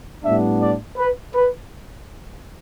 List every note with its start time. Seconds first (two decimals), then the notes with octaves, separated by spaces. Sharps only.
0.23 A2 G3 B3 D4 E5
0.61 D5
0.97 B4
1.35 B4